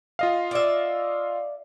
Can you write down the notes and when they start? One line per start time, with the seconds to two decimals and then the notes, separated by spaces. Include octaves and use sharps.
0.19 F4 D#5 F5
0.51 D5 E5